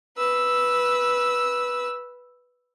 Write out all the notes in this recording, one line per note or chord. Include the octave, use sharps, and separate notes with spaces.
B4 E6